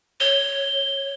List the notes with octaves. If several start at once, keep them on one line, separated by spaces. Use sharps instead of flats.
C#5 G7